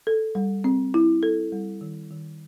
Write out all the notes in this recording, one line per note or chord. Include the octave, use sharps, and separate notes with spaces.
A4
G3
C4
E4
A4
G3
D#3
D#3